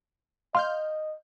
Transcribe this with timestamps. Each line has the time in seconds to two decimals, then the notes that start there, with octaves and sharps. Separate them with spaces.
0.55 D#5 F5 C6 F6 G6